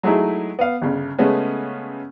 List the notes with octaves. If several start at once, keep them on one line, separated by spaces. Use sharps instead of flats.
F#3 G#3 A3 D#4 E4 G#4
B3 F5
G1 C#3
C#3 G#3 A3 B3 C#4